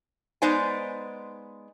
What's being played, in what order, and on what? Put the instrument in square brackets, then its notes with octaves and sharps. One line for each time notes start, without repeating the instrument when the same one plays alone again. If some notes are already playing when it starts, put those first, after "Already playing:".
[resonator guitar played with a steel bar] G#3 B3 D#4 C5 D5 G#5